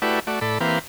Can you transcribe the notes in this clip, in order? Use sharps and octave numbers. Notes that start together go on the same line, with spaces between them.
A3 E4 F#4 G4 B4 D5
A3 F#4 D5
A2 A4 D5 B5
E3 A#3 C4 G4 B4 F5